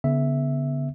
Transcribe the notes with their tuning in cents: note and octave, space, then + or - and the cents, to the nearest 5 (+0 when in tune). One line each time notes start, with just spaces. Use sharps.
D3 -45 B3 +0 E5 +0